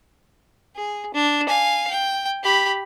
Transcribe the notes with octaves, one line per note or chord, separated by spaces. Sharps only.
G#4
D4
F5 G#5
G5
G4 B5